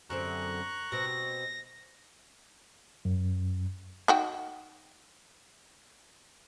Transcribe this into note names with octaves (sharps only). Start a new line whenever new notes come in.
F#2 D3 C4 A#5 C#6 F#6
B2 C4 A#6
F#2
D#4 F#4 G5